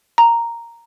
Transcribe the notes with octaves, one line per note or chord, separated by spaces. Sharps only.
A#5